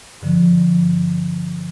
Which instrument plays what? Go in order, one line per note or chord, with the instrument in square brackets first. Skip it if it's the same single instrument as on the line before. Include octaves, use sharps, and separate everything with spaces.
[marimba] G2 D3 F3